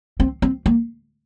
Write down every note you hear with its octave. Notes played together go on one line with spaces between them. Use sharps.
C4
C4
A#3